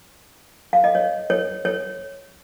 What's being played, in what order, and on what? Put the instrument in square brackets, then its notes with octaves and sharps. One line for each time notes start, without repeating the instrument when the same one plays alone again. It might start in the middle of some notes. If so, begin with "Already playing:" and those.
[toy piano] F5
D#5
C#5
C#5
C#5